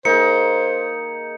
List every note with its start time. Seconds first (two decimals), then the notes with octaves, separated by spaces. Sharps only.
0.05 A#3 D#4 G#4 C5 C#7